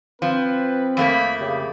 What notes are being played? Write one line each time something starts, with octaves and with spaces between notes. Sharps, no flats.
F3 C4 B4
F2 A3 A#3 B5
C#3 G4